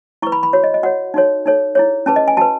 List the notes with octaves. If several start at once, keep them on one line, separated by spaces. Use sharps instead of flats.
E4 B4 C#6
B5
B5
F#4 C#5
D#5
D#5
F#4 C#5 F#5
D#4 F#4 A4 C#5
D#4 A4 C#5
E4 G#4 C#5
C#4 G#4 B4 A5
D#5
G#5
F#4 B4 A5